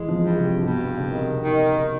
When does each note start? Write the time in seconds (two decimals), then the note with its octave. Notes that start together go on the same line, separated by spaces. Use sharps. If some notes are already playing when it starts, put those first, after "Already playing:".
Already playing: E3 G#3
0.08 F3
0.23 G2
0.36 C3
0.63 G2 B2
0.97 C#3
1.03 C3 D#3
1.44 D#3